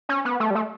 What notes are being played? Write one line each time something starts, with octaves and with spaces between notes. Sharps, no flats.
C#4
B3
A3
G3
A3